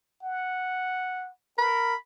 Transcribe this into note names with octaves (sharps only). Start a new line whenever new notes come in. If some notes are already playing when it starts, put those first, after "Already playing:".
F#5
A#4 B5